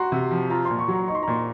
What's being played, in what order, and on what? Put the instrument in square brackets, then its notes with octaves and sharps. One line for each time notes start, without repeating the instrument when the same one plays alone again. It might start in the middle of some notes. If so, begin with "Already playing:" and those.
Already playing: [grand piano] F#4 [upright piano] A#5 C6 C#6
[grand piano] C3
F3
[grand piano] F4 [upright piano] A#5
[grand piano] A#2 [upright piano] C6
[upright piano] C#6
[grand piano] F#3
[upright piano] A#5
[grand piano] D#4 [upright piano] C#6
[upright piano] C6
A#5
[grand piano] A#2 [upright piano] C6